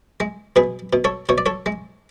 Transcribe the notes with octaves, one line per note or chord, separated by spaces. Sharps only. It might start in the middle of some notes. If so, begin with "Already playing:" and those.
G#3
B2 G#4 B4
B2
A4 C#5
B2 C#5
D5
A4 C#5
G#3